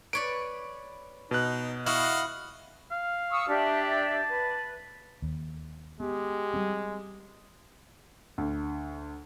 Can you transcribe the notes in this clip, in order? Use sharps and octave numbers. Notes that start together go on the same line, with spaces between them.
B4 C#5 D5 D7
B2 D#4 F#6
E4 F#4 D#5 F5 F#5
F5
C#6 D#6 E6
D4 G4 E5
A5
B4
D#2
G#3 B3 G4
G3 C4
D2